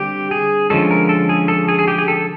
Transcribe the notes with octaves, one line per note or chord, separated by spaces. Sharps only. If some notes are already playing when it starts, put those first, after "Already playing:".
Already playing: D3 G3 C4 G4
G#4
D3 F3 G#3 C#4 A4
A#4
A4
G#4
A4
G#4
G#4
G4
G#4
A4